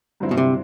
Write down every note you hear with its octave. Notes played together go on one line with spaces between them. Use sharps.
G2 D3 F#3 C4 E4
B2
C3